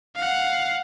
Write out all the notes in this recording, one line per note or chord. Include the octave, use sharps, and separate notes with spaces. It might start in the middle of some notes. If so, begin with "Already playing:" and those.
F5 F#5